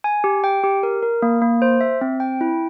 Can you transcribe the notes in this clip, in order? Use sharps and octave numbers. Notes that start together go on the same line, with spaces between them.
G#5
G4
G5
G4
A#4
A#4
A#3
A#3
C5
E5
C4
G5
E4